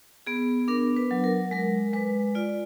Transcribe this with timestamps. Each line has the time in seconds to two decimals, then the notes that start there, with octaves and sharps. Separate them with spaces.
0.27 B3 G#4
0.68 D4 A#4
0.97 B4
1.11 F#3
1.24 A#4
1.51 G#3 A#4
1.93 G#3 B4
2.35 F4 D5